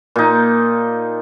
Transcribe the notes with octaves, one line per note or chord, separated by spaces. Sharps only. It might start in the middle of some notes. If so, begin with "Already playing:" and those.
A#2 D#4